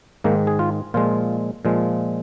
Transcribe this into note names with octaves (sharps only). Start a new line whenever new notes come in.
G#2 D#3 G#3 A#3
G#4
F4
A#2 F3 G#3 F4
A#2 F3 G#3